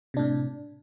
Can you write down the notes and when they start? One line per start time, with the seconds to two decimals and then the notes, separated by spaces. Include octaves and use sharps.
0.14 C3
0.17 D4
0.19 A2